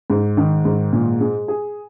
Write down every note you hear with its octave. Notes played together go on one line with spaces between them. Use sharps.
G#2
D#3
G#2
A#2
G#3
G#4